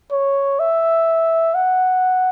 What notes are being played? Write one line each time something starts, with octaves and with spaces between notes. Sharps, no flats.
C#5
E5
F#5